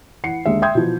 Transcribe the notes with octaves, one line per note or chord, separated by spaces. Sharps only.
E3 F#5 C7 C#7
D#2 D3 G#3 E5
E5 G5 C6 D#6 G6 G#6
B2 E3 F3